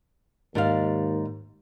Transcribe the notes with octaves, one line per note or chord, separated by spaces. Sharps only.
D#2 G#2 D5 F5